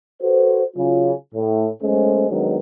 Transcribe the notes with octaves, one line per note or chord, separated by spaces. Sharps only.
F#4 A4 B4 C5
C#3 F#3 F4
A2
B1 G#3 A3 C#4 C5
F2 D#3 F#3 G#3 B3 D4